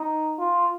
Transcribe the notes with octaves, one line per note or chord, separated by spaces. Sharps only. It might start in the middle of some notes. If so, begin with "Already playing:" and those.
Already playing: D#4
F4